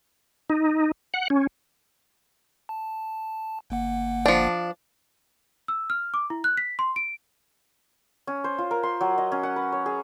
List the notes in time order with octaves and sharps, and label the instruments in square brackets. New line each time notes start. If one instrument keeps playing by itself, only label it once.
[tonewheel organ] D#4
F#5
C#4
[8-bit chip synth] A5
G1 A#3 F#5
[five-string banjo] F3 D4
[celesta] E6
F6
D6
E4
F#6
B6
C6
D7
[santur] C#4
C5
F4
A#4
C6
F#3
D#5
C#4
F#5
B4
C#5
G#4